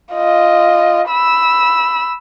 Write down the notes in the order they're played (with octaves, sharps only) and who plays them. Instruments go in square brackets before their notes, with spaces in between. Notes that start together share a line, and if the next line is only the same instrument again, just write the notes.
[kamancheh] F4 D#5
B5 E6